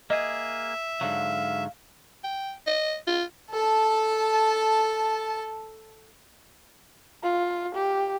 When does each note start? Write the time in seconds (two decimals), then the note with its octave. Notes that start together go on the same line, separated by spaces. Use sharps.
0.10 A#3 G#4 D#5 E5
1.01 G#2 D3 F#3 F5
2.24 G5
2.67 D#5
3.07 F4
3.50 A4 A5
7.23 F4
7.74 G4